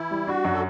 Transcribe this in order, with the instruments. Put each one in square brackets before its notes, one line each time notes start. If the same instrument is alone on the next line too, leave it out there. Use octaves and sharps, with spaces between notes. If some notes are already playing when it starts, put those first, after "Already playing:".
Already playing: [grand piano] E3 [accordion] E4
[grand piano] G3
[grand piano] D4 [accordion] F#4
[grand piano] F#2
[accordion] A4